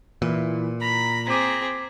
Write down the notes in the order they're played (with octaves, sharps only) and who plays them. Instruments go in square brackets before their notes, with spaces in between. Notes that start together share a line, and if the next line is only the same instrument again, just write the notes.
[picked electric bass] A#2 [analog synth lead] E3
[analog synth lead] A#5 [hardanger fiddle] B5
[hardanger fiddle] C4 G#4 [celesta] D6 B6